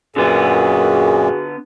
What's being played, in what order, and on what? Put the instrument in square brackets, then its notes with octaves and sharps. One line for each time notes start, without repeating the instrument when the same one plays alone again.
[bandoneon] F#2 A#2 [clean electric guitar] D3 B3 [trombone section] F#4 G#4